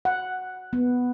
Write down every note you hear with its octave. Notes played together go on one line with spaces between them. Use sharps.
F#5
B3